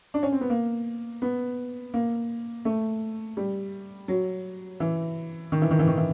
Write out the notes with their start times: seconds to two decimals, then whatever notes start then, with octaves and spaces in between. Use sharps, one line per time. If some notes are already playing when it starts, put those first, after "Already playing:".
0.14 D4
0.23 C#4
0.32 C4
0.41 B3
0.50 A#3
1.22 B3
1.94 A#3
2.65 A3
3.37 G3
4.08 F#3
4.80 E3
5.52 D#3
5.62 E3
5.71 D#3
5.79 E3
5.88 D#3
5.97 E3